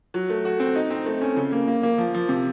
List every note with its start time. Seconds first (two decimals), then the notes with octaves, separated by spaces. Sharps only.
0.14 F#3
0.30 A3
0.45 F#4
0.60 C4
0.75 D#4
0.91 C4
1.06 A3
1.21 C#4
1.36 C#3
1.52 A#3
1.67 A#3
1.83 A#3
1.98 F3
2.14 F3
2.29 C3